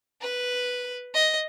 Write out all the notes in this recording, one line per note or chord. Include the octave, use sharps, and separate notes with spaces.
B4
D#5